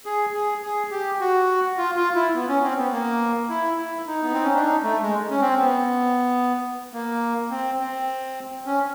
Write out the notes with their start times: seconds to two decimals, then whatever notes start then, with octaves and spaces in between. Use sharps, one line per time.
0.06 G#4
0.34 G#4
0.63 G#4
0.91 G4
1.20 F#4
1.78 F4
1.96 F4
2.15 E4
2.34 B3
2.49 C#4
2.63 C4
2.78 B3
2.92 A#3
3.49 E4
3.78 E4
4.07 D#4
4.22 B3
4.33 C4
4.43 C#4
4.54 D4
4.64 D#4
4.83 A3
5.02 G#3
5.30 C#4
5.41 C4
5.59 B3
6.94 A#3
7.51 C4
7.79 C4
8.66 C#4